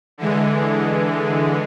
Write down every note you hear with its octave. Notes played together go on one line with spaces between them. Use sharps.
D3 E3 G#3